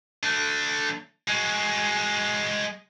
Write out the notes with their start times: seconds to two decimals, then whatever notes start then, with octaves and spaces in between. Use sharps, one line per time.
0.23 A3 D4
1.28 G#3 F#4